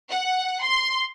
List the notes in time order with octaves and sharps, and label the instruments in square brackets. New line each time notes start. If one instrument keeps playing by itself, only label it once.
[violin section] F#5
C6